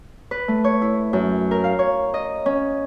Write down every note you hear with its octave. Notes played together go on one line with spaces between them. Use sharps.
B4
A3
C#5
E4
F#2
A#4
F5
C#5
D#5
C#4